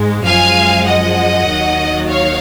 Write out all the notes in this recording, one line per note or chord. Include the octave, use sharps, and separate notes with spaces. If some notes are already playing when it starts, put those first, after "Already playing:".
Already playing: G#2 G#3
F#2 F3 G#3 F5 G#5
D#5 F#5
D#2 D#3 F#3
C#5 F5